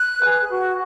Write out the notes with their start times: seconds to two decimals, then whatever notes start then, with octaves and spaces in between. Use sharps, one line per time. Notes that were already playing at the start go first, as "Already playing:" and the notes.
Already playing: F#6
0.20 G#4 B4
0.50 F#4